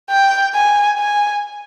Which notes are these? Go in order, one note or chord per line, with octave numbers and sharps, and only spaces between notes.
G5
G#5
G#5